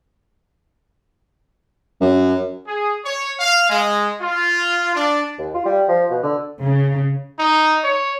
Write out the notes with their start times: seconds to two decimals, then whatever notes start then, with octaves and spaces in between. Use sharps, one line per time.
2.01 F#2
2.67 G#4
3.04 C#5
3.39 F5
3.70 G#3
4.21 F4
4.94 D4
5.39 D#2
5.54 F4
5.65 G3
5.88 F3
6.10 B2
6.23 D3
6.62 C#3
7.39 D#4
7.84 C#5